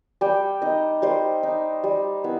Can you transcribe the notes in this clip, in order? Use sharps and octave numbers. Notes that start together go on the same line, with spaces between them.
G3 G5
D#4 D#5
G3 C5
D#4
G3
B3 E4